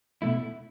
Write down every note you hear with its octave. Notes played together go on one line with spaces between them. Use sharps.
B2 A3 E4